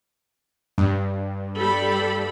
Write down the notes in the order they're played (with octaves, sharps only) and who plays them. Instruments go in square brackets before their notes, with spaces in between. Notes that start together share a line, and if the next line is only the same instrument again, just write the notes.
[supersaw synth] G2
[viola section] G3 A4 B5